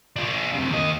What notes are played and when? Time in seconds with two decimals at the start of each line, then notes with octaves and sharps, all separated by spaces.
0.16 D4 F4
0.54 F#2 C3
0.70 D#2 D#5